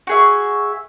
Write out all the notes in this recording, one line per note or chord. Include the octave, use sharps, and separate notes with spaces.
F#4 G#4 E5